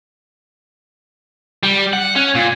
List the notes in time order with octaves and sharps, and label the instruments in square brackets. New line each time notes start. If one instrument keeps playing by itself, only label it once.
[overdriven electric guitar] G3
F#5
C#4
A#2